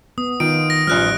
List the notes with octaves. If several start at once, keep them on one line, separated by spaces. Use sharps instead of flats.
B3 D#6
D#3 B3 D#4 F4 D7
A#6
A1 F3 G3 F6 F#6